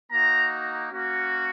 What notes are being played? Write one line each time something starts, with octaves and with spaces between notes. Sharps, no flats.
A#3 D#4 F#4 A#5
A#3 C#4 F#4